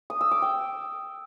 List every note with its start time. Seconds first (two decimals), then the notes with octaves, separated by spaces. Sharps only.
0.10 D#6
0.21 E6
0.31 D6
0.42 G5